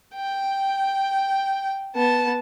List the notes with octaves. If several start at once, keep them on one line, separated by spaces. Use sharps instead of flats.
G5
B3 A5